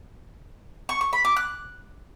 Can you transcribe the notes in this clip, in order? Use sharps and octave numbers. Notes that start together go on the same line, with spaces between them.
C#6
C#6
B5
D6
F#6